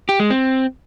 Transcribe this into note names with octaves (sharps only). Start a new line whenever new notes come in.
G4
G#3
C4